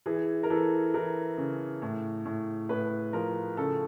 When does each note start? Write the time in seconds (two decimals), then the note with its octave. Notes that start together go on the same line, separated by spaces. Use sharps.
0.06 E3 G#4
0.43 A#4
0.50 E3 A4
0.94 E3 A#4
1.37 C#3
1.82 A2
2.25 A2
2.69 A2 B4
3.13 F3 A#4
3.57 C#3 A4